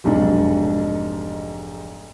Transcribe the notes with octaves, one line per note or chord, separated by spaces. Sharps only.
F1 B1 G#2 D4